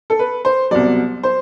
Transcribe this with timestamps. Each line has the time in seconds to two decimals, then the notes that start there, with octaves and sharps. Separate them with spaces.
0.10 A4
0.19 B4
0.45 C5
0.71 C2 B2 F#3 D5
1.23 C5